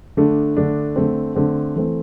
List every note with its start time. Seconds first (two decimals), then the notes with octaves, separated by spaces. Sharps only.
0.17 D3 A3 D4
0.57 D3 A3 D4
0.96 D3 A3 C4
1.35 D3 A3 C4
1.76 E3 A3 C4